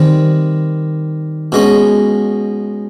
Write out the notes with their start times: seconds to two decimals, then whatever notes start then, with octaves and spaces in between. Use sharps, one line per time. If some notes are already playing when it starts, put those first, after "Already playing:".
Already playing: D#3 G3 C4
1.52 B2 G#3 C#4